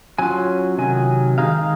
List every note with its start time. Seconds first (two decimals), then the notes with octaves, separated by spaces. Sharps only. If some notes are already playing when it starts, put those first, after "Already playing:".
0.19 F#3 C#4 F4 G#5
0.78 C3 D#3 F#3 G#5
1.38 D#3 G#3 D#4 F5
1.53 F5